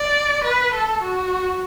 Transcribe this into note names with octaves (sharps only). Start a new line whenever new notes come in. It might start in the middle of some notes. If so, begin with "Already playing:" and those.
Already playing: D5
B4
A4
F#4